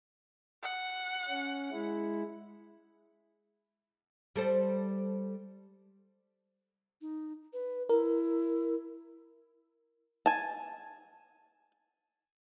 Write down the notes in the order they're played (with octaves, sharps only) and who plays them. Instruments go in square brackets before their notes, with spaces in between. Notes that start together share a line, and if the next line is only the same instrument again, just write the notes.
[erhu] F#5
[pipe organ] C#4
G#3 E4
[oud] G3 A4 C5
[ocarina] D#4
B4
[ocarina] E4 [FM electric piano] A#4
[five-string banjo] G#5 A5